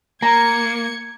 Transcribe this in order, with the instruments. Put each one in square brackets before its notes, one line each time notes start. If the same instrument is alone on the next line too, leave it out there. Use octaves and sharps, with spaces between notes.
[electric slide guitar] A#3 [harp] A#5 [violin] G#6 C#7